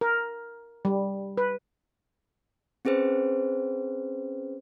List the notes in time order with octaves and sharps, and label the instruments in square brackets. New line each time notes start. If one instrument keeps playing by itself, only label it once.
[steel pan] A#4
G3
B4
[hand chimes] C4 C#4 G#4 B4 C5